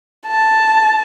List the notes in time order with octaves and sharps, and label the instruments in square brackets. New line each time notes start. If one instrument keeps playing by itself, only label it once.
[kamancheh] A5